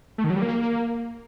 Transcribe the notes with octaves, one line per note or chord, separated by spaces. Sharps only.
A3
D#3
F#3
G3
A#3